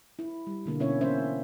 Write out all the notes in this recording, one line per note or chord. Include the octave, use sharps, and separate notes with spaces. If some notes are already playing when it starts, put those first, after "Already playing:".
E4
G3
B2 D3 A#3
B2 C#4 E4 C#5 E5
E3 A#3 C4 C#4 C5 E5